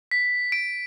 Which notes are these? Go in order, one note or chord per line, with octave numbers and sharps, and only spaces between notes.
B6
D7